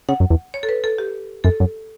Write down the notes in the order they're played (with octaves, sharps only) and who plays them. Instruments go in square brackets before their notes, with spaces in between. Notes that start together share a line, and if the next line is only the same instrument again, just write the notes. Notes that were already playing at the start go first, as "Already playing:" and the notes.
[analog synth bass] C#3 [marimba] F#5
[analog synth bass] F#2
E2
[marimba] C#5
A4
B4
A4
G4
[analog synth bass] F#2 [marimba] A4
[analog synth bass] F#2